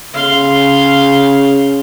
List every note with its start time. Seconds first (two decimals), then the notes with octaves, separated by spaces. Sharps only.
0.14 C#3 F5 C6